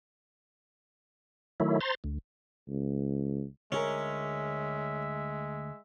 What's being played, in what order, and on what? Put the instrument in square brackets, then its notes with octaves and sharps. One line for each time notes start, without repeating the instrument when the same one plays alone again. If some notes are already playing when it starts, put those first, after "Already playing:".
[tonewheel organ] D#3 F#3 A3 E4
C5 A#5 C6 A6
D2
[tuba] C#2
[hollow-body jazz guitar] D2 G#4 A#4 [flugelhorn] G#3 [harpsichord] C#4 [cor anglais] E5